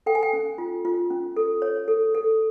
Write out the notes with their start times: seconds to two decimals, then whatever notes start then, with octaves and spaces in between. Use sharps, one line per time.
0.06 A4 G5
0.15 G#5
0.23 G5
0.33 C#4
0.58 F4
0.85 F4
1.11 C#4
1.37 A4
1.62 C#5
1.88 A4
2.15 A4